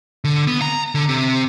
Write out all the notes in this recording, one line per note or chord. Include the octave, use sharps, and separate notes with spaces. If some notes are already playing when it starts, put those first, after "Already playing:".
D3
B3
A#5
D3
C3